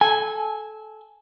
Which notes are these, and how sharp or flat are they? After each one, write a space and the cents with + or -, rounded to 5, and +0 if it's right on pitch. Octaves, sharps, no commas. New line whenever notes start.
A4 -20 G#5 -5